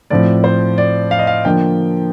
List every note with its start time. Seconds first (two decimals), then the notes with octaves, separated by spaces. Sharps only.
0.10 A2 F3 C4 D5
0.44 C5
0.78 D5
1.11 F5
1.19 D#5
1.27 F5
1.45 D3 F3 A#3 D4 G5